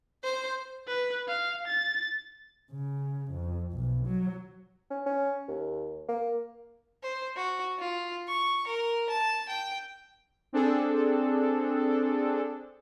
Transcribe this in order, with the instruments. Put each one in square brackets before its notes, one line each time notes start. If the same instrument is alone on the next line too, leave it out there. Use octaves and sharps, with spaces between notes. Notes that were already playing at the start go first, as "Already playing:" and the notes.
[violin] C5
[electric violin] B4
F5
A6
[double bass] C#3
F2
B1
F#3
[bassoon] C#4
C#4
D#2
A#3
[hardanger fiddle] C5
F#4
F4
C#6
A#4
A5
G5
[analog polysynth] C4 D4 G#4 A4